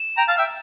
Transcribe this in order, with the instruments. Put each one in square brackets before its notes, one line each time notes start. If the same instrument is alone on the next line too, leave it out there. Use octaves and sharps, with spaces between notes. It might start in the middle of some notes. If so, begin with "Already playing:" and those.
Already playing: [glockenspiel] E7
[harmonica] G5 A#5
F5 A5
E5 G5